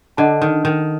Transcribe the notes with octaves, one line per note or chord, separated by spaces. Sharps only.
D3 A4 D#5 F#5 A5
D#3
D#3